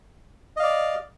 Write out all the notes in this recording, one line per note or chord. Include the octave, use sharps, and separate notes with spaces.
D5 D#5 F5